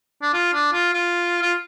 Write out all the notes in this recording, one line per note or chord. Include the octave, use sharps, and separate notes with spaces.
D4
F4
D4
F4
F4
F4